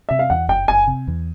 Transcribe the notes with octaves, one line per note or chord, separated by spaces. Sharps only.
C3 E5
F5
E2 F#5
F#1 G5
F#1 G#5
C3
E2